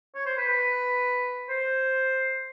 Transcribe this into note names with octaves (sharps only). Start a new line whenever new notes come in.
C#5
C5
B4
B4
C5